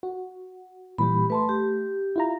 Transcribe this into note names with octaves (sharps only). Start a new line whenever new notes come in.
F#4
A#2 E3 G3 G4 B5
A3 B4 A5 C6
G4
E4 F4 A#5